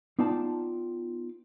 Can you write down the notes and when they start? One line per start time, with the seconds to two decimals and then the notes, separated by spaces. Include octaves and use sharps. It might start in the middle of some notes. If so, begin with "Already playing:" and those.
0.19 B3 D#4 F4 D5 G5 A5